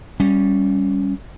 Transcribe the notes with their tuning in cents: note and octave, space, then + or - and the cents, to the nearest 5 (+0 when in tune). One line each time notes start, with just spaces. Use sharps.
G3 +0 C#4 +0